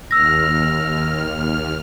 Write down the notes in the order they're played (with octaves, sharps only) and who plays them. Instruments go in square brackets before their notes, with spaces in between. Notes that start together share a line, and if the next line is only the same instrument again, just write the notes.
[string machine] D#2 F6 [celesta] E6 A#6